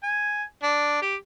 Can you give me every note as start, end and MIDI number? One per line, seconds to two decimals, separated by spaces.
0.03 0.43 80
0.63 1.00 62
1.02 1.15 67